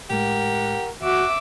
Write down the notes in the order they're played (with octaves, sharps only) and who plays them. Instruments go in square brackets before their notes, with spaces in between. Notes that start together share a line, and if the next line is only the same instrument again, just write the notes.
[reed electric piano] A2 G#3 [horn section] G4 A#4 F#5
[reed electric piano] D#2 [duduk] F#4 [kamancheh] E5 D6